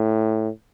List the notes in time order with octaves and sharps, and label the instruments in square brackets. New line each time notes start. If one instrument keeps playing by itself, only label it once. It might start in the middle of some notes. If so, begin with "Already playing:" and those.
Already playing: [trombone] A2